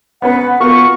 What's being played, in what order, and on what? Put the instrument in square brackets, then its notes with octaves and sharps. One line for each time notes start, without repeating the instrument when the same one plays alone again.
[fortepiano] B3 C#4 B4 [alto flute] F#5
[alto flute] B3 [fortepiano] F4 F#4 A#4 [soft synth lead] C#6